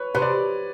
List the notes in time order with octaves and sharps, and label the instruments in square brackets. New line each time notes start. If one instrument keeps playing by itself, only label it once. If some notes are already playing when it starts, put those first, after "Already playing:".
Already playing: [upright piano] B4 C#5
[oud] C3 [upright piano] B4
[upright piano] D5